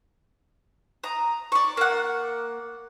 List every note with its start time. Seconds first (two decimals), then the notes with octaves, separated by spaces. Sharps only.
1.04 A#5 D#6
1.52 D5 C#6
1.77 A#3 F#5